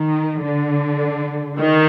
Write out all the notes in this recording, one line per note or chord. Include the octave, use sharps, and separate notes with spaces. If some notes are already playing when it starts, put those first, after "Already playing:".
Already playing: D#3
D3
D#3